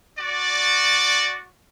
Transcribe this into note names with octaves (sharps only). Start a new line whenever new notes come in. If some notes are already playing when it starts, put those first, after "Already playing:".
F#4 D5